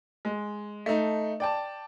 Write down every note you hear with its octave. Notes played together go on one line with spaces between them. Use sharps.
G#3
A3 D#4
D5 G5 A5